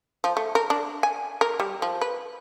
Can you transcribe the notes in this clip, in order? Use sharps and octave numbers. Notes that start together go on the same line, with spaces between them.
F3
A3
A#4
D4
G#5
A#4
G3
F3
B4